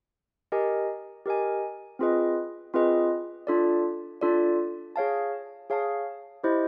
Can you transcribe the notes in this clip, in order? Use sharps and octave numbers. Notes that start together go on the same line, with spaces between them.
G4 A#4 D#5 G#5
G4 A#4 D#5 G#5
C4 F4 G#4 B4 D#5
C4 F4 G#4 B4 D#5
D4 F4 A4 D5
D4 F4 A4 D5
G#4 C#5 F5 A5
G#4 C#5 F5 A5
E4 G4 C5 D#5